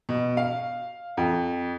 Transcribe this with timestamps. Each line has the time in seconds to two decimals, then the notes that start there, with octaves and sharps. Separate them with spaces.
0.09 B2
0.37 F5
1.17 F2